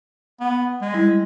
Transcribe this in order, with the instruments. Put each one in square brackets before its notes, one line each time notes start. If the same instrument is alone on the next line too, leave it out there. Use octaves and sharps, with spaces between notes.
[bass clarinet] B3
G#3
[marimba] G3 E4